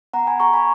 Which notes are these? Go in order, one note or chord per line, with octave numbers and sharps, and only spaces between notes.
B3 F#5 A#5
G#5 B5
G#4 A#5 C#6
G#5 B5